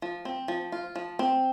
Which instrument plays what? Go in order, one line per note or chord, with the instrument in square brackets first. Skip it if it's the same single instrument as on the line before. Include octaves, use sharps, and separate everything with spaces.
[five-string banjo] F3
C4
F3
F4
F3
C4